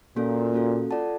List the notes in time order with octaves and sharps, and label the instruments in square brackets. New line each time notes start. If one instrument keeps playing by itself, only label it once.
[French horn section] A#2 [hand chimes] A#3 C#4 F#4 A4
[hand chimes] A#3 C#4 F#4 A4
F4 A4 D5 F#5 A5